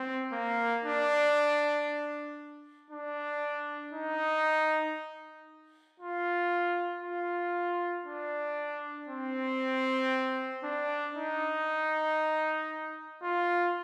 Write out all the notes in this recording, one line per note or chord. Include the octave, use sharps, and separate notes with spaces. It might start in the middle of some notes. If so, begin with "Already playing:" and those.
Already playing: C4
A#3
D4
D4
D#4
F4
F4
D4
C4
D4
D#4
F4